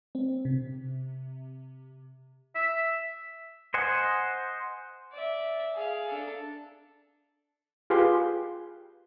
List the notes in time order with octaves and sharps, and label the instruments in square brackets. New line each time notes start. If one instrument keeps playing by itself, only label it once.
[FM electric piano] C4
C3
[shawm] E5
[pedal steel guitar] C5 D#5 F#5 G#5
[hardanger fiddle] D5 E5
G#4 F5
D4 A4
[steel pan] F4 G4 G#4 B4 C6